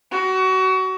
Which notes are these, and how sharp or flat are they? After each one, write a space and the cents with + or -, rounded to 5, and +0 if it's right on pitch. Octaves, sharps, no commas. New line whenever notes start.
F#4 +25